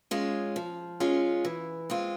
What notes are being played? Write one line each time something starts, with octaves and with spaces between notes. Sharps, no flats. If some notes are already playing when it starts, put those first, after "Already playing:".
G#3 C#4 F4
F3
G#3 C#4 F4
E3
G#3 C4 F4